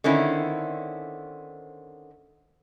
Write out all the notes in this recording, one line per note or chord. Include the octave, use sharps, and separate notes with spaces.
D3 D#3 C4 C#4 E4